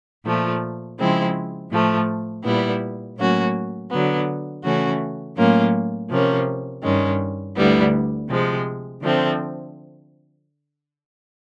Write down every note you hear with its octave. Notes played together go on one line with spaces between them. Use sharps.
A#2 F3 A3
C#3 F3 G#3 C4 E4
A2 F3 A3
A#2 G3 B3 E4
A2 F#3 A#3 C#4 F#4
D3 F#3 B3
C#3 E3 A3 C#4 F#4
A2 F#3 A#3 C#4 F4
C3 F3 A#3 C#4
G2 D#3 G#3 C#4
D2 D3 G3 B3 E4
C3 F3 G#3
D3 F3 A3 C4